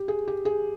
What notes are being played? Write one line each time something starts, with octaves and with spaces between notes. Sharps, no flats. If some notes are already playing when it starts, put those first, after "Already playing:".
Already playing: G4
G#4
G4
G#4